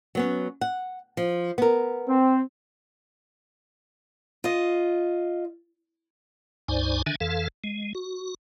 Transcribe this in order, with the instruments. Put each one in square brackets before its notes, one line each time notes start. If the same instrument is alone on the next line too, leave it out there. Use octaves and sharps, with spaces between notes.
[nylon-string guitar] F#3 B3 C#4
F#5
F3
B3 A#4
[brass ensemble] C4
[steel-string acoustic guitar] F4 D#5
[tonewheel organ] C#2 G2 D#4 C5 D5 G#5
D3 D#3 D4 E5 G#5
F2 E3 A4 F5
G#3
F#4